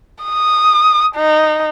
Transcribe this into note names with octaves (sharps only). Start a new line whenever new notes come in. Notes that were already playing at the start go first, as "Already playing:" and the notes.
D#6
D#4